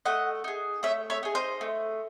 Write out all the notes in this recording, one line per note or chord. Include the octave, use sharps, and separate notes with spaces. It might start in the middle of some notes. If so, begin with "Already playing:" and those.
A3 D#5 F#5
D#4 G#4
A3 C#5 E5
C#5 E5
D#4 G#4
C5 D#5
A3